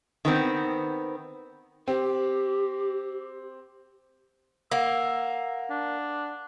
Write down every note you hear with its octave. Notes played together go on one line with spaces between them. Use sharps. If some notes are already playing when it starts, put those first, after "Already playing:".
D#3 B3 C4
C4 G4
A#3 F#5 E6
D4